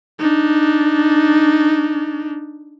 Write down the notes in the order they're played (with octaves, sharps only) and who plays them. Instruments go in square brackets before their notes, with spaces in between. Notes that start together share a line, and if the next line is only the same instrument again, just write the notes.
[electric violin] D4 D#4